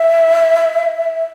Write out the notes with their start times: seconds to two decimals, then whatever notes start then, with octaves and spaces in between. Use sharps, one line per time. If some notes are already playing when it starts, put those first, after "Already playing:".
Already playing: E5